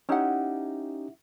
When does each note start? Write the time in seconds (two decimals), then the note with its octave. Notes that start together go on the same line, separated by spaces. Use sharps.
0.09 C#4 D#4 E4 G4 F#5